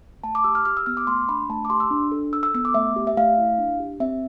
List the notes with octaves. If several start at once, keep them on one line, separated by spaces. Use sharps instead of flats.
A3 A5
D6
G4 E6
F6
G4 F6
E6
B3 F6
D6
A3 C6
D4 B5
A3 A5
D6
G4 C6
E6
D4
A4
A4 E6
E6
B3 E6
D6
A3 E5
G4
E5
A3 F5
E4
D4
G4
C4 E5